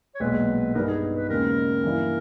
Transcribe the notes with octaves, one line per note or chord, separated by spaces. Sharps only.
C#5
B1 A#2 G#3 B4
G2 G3 B3 D#4 A#4
G#4
G#4
B4
D#2 C#3 G#3 A#4
G2 E3 A#3 E4